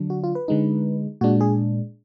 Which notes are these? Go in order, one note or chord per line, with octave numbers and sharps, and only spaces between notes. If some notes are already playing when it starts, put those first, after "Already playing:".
Already playing: D3 F#3 D4
F#4
F4
B4
D3 G#3 D#4
A#2 G#3 D4 F#4
G#4